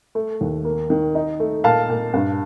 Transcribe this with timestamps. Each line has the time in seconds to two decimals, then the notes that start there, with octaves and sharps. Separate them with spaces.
0.15 A3
0.41 D#2
0.65 A#3
0.90 D#3
1.15 D#4
1.40 A3
1.64 A#2 F5 A5
1.89 A#2
2.14 G2